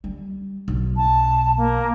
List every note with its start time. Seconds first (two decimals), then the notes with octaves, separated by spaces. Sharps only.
0.04 G3
0.68 B1
0.96 A5
1.57 A#3